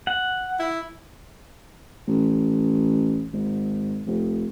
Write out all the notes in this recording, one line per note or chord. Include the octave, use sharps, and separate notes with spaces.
F#5
E4
A1
G#1
F1